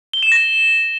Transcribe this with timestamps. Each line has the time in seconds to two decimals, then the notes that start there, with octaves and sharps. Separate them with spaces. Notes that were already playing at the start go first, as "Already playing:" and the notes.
0.13 G7
0.23 E7
0.32 A#6